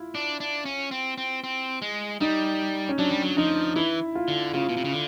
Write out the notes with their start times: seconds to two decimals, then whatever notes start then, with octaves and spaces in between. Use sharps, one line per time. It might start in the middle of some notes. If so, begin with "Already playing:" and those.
Already playing: E4 F4
0.15 D4
0.40 D4
0.65 C#4
0.91 C4
1.18 C4
1.44 C4
1.82 G#3
2.20 G3 D#4
2.89 C#4
2.98 F#3 D4
3.10 G3
3.22 F#3
3.37 F3 D#4
3.76 E3 E4
4.15 F4
4.28 D3
4.54 C#3 F4
4.69 B2
4.77 C3
4.85 C#3
4.93 D3